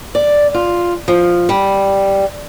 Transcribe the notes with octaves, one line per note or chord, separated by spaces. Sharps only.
D5
F4
F3
G3